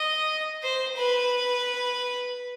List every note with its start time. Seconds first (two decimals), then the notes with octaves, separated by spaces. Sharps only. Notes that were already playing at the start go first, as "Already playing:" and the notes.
Already playing: D#5
0.63 C5
0.97 B4